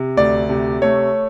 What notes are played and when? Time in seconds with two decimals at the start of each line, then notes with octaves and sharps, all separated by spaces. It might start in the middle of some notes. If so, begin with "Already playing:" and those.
Already playing: C3
0.17 D2 D5
0.49 C3
0.82 A3 C#5